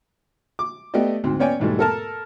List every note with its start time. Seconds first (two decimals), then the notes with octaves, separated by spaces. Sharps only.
0.59 D6
0.94 A3 B3 G4 D5 D#5
1.24 D2 G#2 C4
1.39 B3 C#4 C#5 D5 G5 G#5
1.60 E2 G#2 B2 G3 A3
1.79 A4 A#4 A5